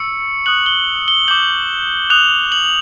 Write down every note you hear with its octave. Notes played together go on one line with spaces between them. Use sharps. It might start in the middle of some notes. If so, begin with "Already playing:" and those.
Already playing: C#6 E6 C#7
D#6 F#6 F#7
G7
G7
D6 G6 F#7
D#6 F#6 F7
F#7